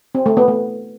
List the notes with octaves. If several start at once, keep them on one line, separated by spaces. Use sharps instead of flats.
C4
A3
B3
A3